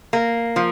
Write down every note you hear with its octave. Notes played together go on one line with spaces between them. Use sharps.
A#3
F3